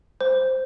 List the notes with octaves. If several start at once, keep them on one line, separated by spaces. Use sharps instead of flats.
C5